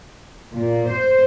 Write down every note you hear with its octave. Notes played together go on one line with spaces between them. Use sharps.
A#2
C5